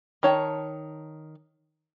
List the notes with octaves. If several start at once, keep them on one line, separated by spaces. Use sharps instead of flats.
D#3 C#5 A5